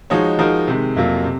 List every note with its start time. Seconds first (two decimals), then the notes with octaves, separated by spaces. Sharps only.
0.10 F3 G#3 D#4 F#4 C#5
0.39 F3 G#3 D#4 F#4 A#4
0.68 C3 D#3 G#3
0.96 F2 C3 F#3 A#3 F4
1.24 C3